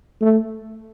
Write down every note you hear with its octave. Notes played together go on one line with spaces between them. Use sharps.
A3